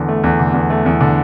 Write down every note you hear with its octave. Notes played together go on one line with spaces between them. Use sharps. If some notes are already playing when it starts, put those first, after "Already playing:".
Already playing: E2 D3
A3
E2
D3
E2
A3
E2
D3